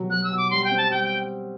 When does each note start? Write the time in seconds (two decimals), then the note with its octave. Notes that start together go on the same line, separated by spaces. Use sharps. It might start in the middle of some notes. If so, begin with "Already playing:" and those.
Already playing: B2 F#3 G3
0.10 F#3 F#6
0.24 E6
0.30 B2
0.37 D6
0.51 G3 C6
0.64 G5
0.71 C4
0.77 A5
0.91 G3 G5
1.04 G5